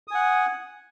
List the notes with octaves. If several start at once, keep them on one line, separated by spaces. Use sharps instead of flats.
F#5 G#5 D#6